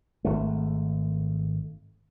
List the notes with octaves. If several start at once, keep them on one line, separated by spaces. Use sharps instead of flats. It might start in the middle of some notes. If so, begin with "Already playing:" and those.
G#1 A3